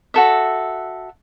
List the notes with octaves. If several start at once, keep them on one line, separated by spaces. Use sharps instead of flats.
F#4 A4 E5